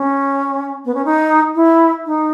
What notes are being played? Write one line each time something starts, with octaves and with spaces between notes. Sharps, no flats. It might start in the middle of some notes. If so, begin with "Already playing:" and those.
Already playing: C#4
B3
C#4
D#4
E4
D#4